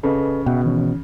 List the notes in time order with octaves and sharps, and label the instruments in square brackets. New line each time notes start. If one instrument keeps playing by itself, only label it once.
[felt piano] C#3 [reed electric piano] A4 B4 D#5
[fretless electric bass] B2 [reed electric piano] E5 F#5 G5
[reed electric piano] D#3 E3 C#4